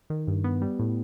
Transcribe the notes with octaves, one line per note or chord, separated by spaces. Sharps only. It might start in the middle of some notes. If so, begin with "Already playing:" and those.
D#3
G2
B3
G3
A2